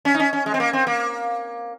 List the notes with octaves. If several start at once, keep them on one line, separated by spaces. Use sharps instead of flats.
C#4
D#4
C#4
C#4
G#3
C4
A#3
C4
A#3